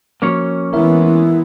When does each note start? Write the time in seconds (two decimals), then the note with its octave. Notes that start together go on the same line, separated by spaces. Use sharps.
0.22 F3 A#3 C#4 F#4 C#5
0.73 E3 G#3 B3 E4 A#4 E5
1.03 E4